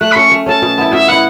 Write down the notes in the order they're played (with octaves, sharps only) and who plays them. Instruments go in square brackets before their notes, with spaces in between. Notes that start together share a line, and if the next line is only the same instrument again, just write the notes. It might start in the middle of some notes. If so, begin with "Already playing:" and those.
[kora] A3 [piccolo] F#6
[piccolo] B5
[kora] C#4 A4 [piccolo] C#6
[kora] A3
[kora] C#4 A4 [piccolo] A5
[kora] B2
B3 E4
[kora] B2 [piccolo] E5
[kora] B3 E4 [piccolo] F#5